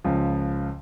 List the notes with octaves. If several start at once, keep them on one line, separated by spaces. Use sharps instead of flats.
C#2 C#3 F3